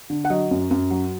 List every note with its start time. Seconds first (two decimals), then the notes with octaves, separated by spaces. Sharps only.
0.10 D3
0.25 F#5
0.30 F#3 D#5
0.51 F#2
0.71 F#2
0.91 F#3